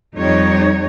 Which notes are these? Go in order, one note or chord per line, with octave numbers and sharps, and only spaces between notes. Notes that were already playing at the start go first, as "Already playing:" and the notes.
F2 G3 D#4 C#5